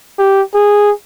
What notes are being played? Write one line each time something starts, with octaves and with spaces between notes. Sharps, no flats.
G4
G#4